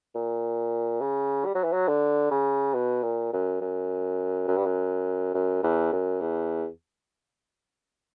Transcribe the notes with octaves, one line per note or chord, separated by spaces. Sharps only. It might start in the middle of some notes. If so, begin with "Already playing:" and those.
A#2
C#3
G3
F#3
E3
F#3
D3
C#3
B2
A#2
F#2
F#2
F#2
G2
F#2
F#2
E2
F#2
E2